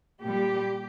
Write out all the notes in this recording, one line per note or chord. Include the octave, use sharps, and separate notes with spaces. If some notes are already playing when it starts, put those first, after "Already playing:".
A#2 G3 G4